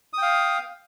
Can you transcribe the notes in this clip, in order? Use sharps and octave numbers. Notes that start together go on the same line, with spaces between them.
F5 G5 D#6